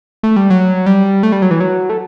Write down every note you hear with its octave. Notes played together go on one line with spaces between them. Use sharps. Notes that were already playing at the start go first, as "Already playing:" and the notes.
A3
G3
F#3
G3
A3
G3
F#3
E3
F#3
A3